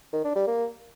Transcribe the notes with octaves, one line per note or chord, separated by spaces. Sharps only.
D#3
D4
G3
A#3